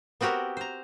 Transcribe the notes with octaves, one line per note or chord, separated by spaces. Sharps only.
B3 C4 F#4 G4 A#4
C5 A#5